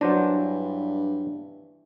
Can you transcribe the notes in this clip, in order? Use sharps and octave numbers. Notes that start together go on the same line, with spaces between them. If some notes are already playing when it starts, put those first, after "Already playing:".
G2 E3 F#3 D4 C5 A#5